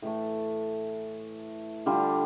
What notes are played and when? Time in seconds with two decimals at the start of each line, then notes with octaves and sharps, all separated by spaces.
0.02 A2 E3 A3
1.86 D3 G3 D4 F4